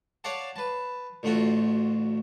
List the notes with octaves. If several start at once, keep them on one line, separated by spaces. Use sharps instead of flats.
C#5 D5 F5 F#5 A5
B4 A5
A1 D2 A3 F4 F#4